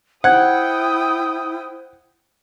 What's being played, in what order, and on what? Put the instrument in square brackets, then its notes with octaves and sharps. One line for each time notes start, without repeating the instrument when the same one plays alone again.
[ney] E4 [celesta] C5 G#6 [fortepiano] F#5 [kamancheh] G5 D#6